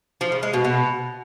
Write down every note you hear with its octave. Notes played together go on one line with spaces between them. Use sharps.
F3
C#3
G#3
B2
B2